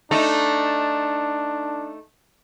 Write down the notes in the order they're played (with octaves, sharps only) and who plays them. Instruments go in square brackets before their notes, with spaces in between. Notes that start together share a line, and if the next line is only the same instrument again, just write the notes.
[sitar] A3 D#4 [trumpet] D4